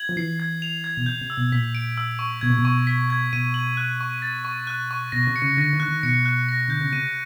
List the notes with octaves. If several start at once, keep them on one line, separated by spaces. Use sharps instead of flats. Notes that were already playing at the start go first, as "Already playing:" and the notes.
Already playing: G#6 F#7
F3
E3 C7
G#6
F7
G#6
B2
C3 G6
C3
E6
B2
A#2 B6
D7
E6
C#6
B2 G#6
A#2
B2
C#6
B6
G#6
B2 D#7
F#7
F#6
C#6
A6
C#6
F#6
C#6
B2 A#6
C3
C#7
C#3
D3 A#6
D#3
D3 F#6
D#3
B2 C#7
F#6
A#6
D3 G6
C#3
C3 D#7